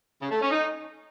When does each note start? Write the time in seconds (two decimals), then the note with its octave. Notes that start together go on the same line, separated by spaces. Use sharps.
0.21 C#3
0.31 A3
0.41 C#4
0.51 D#4